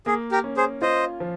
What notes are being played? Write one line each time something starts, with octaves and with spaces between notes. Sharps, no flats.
A#3 G#4
G4 A#4
C#4
G#4 C5
F4 C5 D#5
F3